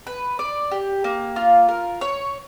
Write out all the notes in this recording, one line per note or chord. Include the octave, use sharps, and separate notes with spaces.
B4
D5
G4
A#3
F4
A#4
C#5